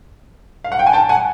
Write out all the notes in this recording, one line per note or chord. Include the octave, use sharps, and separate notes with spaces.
F5
F#5
G5
G#5
G5 A5
F#5 G#5